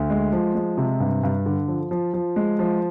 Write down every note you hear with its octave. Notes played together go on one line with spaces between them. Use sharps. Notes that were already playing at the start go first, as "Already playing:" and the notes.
Already playing: D2
G#3
F3
G#3
C3
G2
G2
D3
F3
F3
F3
G#3
F3